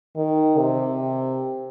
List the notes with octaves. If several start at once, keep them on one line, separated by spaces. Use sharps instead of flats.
D#3
C3